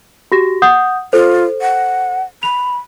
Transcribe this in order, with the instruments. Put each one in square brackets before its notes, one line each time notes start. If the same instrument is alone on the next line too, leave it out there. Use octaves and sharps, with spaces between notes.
[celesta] F#4 G4 A#6
F#5 D#6 G6
[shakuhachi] F4 [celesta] A4 C5
[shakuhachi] F#5
[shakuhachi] B5 [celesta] F7